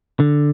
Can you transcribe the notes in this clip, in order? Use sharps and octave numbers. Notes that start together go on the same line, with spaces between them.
D3